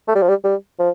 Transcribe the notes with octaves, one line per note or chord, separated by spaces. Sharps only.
A3
G3
F3
G3
G3
F3